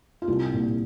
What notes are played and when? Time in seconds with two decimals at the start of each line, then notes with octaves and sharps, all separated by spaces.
0.22 F4
0.27 C2 G4
0.53 A#2